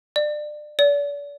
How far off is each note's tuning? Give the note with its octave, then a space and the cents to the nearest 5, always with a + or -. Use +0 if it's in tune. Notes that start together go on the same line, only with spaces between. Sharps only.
D5 +25
D5 -40